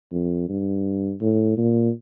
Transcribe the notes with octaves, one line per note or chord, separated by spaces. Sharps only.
F2
G2
A2
A#2